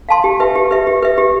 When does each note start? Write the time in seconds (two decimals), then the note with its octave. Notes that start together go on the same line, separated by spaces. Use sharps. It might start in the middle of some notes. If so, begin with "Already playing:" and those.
0.09 F5 A5 C6
0.24 G4
0.40 B4 E5
0.56 G4
0.71 B4 E5
0.87 G4
1.03 B4 E5
1.18 G4